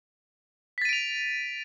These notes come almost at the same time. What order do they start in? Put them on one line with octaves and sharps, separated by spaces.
B6 A6 D#7 D7 F7